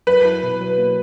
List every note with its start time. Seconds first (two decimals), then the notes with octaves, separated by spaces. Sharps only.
0.07 F#3 B4
0.25 E4
0.43 B2
0.61 F#3
0.78 A#3